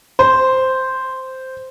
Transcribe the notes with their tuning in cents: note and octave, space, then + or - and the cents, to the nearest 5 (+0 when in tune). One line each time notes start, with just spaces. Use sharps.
C5 -5